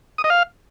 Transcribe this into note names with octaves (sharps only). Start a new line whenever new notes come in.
D#6
D#5
F5